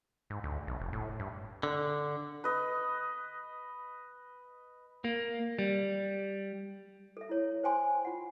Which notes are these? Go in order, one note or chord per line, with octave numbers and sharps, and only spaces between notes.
G#2
D2
B1
F1
A2
G2
D3
B4 D#5
A#3
G3
A4 E5
E4 C#5
C5 G5 G#5 C6
F4 F#5